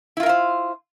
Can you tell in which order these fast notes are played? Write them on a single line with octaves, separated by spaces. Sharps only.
E4 F4 A#4 F5 C5